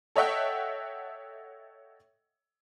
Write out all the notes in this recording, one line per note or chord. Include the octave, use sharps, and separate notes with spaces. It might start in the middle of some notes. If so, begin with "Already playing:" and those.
A4 C#5 D#5 E5 F#5 G5